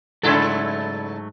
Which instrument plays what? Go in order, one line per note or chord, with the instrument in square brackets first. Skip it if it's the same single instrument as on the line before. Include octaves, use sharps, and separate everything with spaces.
[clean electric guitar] G#2 F#3 A3 [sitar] C#3 E4 A4